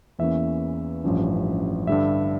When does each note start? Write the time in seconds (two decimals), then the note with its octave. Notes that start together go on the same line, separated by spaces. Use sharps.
0.19 E2 E3 A#3 C#4 E5
1.04 A1 G2 F3 C#4
1.87 G2 D3 G3 E5